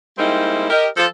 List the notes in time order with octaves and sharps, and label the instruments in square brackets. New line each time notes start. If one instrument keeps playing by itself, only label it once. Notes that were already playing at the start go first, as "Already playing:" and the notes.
[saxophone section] G3 G#3 A#3 C4 D#4 E4
G4 A#4 D#5
F3 A4